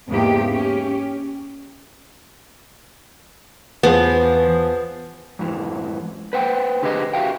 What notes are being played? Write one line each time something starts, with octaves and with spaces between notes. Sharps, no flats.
E2 G#2 C#3 A#3 G4
C#4 G4
E2 E3 F3 B3 G#4
F2 G#2 E3
B4 C5 F#5 G5
D3 G4 G#4 B4 D#5
F#4 G4 A4 E5 F5 G5